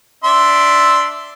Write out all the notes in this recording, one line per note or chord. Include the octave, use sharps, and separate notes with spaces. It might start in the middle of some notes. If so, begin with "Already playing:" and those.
D4 E5 C6